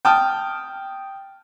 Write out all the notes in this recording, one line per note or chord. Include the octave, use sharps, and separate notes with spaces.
G5 A5 D#6 F6